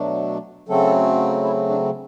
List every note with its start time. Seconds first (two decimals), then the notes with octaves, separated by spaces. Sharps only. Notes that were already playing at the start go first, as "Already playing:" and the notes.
Already playing: B2 F#3 A3 D4
0.69 C#3 F#3 A3 C4 A4
1.44 E4
1.69 D4